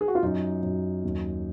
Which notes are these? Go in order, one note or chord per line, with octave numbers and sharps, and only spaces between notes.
G#4
F#4
F4
F#2 D#4
F#2
D#2